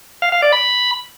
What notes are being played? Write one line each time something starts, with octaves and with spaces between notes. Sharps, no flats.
F5
F5
D5
B5